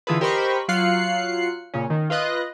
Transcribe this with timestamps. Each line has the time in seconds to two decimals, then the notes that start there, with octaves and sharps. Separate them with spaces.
0.07 D3 E3 F4 G#4 A4 B4
0.21 G4 A#4 C5 D#5 B5 C#6
0.68 F#3 F4 F5 F#6 C7 C#7
1.74 A#2 C#3 C#4
1.90 D#3
2.10 F4 B4 D#5 F#6